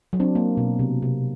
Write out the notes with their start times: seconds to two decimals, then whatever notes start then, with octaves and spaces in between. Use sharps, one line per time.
0.13 F#3
0.20 C4 D4
0.35 A#3
0.57 B2
0.79 C3
1.02 C3